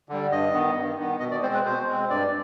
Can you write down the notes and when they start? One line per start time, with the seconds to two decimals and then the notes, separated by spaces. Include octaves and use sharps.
0.09 D3 G3
0.31 G2 D#5
0.53 D#3 B3
0.76 G2
0.98 D#3 B3
1.20 B2 D#5
1.31 D5
1.43 G#3 C4 C5
1.54 B4
1.65 B2 C5
1.88 G#3 C4
2.09 G2 D5